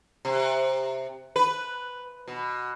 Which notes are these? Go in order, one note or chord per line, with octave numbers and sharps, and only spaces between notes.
C3
B4
B2